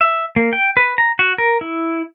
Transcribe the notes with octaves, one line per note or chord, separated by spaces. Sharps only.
E5
A#3
G5
B4
A#5
F#4
A#4
E4